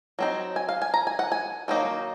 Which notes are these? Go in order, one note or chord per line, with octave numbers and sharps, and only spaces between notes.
F#3 C4 D#4
G#5
F5
G#5
A#5
G#5
F#5
G#5
D#3 F#3 A#3 D#4